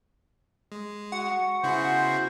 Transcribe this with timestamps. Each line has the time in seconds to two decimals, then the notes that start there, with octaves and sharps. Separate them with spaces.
0.72 G#3
1.12 F#4 F#5
1.64 C#3 B3 E4 F#4 G#4 C5